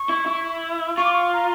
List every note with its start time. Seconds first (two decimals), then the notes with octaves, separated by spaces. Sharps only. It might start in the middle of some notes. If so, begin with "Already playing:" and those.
Already playing: C#6
0.09 E4
0.26 E4
0.97 F4 C#6
1.05 D6
1.13 C#6
1.33 A#5